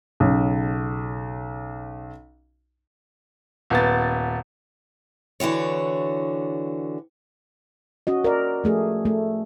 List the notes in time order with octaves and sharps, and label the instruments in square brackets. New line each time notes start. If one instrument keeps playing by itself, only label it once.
[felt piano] B1 C#3
[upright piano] D#1 B3 A6
[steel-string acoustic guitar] D3 E3 F#4 C#5
[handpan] C#4 F#4 D#5
A#4 D5
F3 A3 G#4
A3